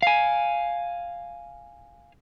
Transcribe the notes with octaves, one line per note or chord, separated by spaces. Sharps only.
F5 G#5